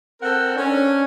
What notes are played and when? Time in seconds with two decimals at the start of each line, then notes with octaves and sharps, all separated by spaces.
0.22 C4 A4 A#4 F#5
0.55 C#4 D4